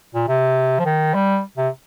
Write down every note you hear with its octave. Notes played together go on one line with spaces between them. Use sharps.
A#2
C3
F3
D#3
G3
C3